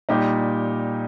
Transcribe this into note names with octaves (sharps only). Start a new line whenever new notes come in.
A#2 G3 D#4 G4